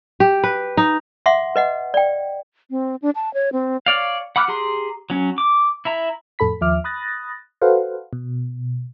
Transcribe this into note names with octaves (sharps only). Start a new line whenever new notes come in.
G4
B4
D#4
E5 F#5 C6 D6
B4 D#5 F#5
D5 G5
C4
D4
A5
C#5
C4
C#5 D5 F5
F#5 B5 D6 F6 F#6
G4 G#4 A#5 C6
F#3 C#4
D6
E4 E5 A#5
F2 A2 A4 B5 B6
D#2 F3 E5 D6 F6
B5 D#6 F#6 A6 A#6
F#4 A4 B4 C5 F5 F#5
B2